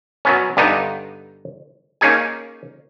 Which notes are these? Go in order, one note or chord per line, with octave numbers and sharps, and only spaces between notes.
F#3 B3 C#4
G2 D3 B3 D4 D#4
A#3 C#4 D#4 G#4 G#5